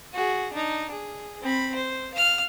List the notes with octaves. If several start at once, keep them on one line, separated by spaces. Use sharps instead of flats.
F#4 G#4
D4 D#4
G#4
C4 B5
C5
F5 F6